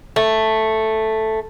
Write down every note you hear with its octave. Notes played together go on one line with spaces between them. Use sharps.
A3